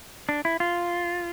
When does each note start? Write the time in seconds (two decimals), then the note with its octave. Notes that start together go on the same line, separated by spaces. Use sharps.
0.29 D4
0.45 E4
0.60 F4